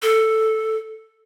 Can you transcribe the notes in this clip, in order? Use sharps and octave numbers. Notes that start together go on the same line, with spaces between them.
A4